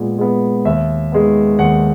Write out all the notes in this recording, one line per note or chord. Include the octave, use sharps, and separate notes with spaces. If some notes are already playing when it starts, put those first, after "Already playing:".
Already playing: A#2 G#3 B3
G#3 B3
D#2 E5
D#3 G#3 B3
D#2 F#5